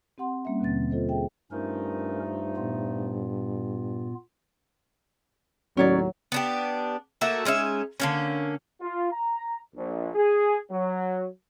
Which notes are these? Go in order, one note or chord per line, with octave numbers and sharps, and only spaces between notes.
C4 G4 F#5 C6
G3 A#3 C#4 E5
D#2 B2 D3 C4 A6
F4 A4 C5 D#5
G#4 E5 G5
G2 F3 A3 C#4 D#4 A#4
A#2 B3 F4
D#2 A2 F#3 C#4 C#5 D5
B3 D4 G4
A3 A#3 F#4 E5
G#3 C#4 D#4 E5
D3 A#3 C#4
F4
A#5
A#1
G#4
F#3